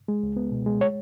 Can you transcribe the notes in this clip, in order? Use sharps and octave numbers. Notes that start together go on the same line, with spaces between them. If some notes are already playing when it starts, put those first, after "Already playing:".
G#3
C#2
B3
B2
G#3
C#5